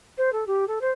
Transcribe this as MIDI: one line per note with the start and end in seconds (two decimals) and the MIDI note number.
0.17 0.32 72
0.32 0.44 69
0.47 0.67 67
0.67 0.79 69
0.81 0.90 72